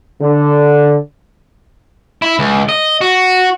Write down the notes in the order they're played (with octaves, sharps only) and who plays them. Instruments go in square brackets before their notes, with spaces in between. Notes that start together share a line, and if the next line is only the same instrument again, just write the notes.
[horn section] D3
[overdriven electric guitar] E4
C#2
D#5
F#4